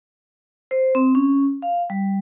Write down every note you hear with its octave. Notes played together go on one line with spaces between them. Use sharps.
C5
C4
C#4
F5
G3